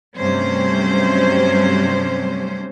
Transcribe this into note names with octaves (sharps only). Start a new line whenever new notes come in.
G2 C3 F#3 A3 C#4 C5